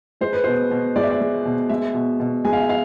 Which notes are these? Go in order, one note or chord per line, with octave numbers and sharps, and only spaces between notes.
G#3 C5
B4
B2 C5
B2
G#3 D5
E5
D5
G#3
B2
G#3 E5
B2
B2
G#3 G#5
F5
E5
F5